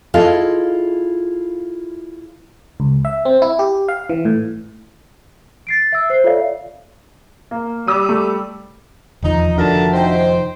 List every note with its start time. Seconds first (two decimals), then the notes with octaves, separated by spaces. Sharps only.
0.14 E4 F4 G#4 A4 D#5 F5
2.80 C#2
3.05 E5
3.25 C4
3.42 E4
3.59 G4
3.88 F5
4.10 E3
4.25 A2
5.67 A6 C7 D7
5.92 E5 E6
6.10 C5 C7
6.24 F4 A4 C#5 D5 E5 F5
7.51 A#3
7.88 G3 D6 E6 D#7
8.09 A3
9.23 F1 E2 D#3 F3 D#4
9.58 D3 D4 F#4 A#4 E5 A5
9.93 D#4 C5 G5